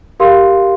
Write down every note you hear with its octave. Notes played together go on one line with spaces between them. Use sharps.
G4 A#4 F5 C6